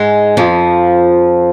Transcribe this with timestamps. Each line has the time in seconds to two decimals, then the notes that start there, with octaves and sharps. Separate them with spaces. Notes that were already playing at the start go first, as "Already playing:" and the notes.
Already playing: G#2 G#3
0.37 F2 F3